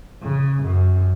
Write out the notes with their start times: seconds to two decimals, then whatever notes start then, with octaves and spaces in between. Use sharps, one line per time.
0.23 C#3
0.63 F#2